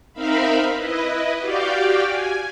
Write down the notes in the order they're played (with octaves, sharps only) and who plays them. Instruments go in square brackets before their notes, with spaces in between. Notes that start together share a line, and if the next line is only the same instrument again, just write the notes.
[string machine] C4 D#4 A#4 E5 F5 B5
E4 B4 D#5
F#4 G4 D5 F5 G5
G#5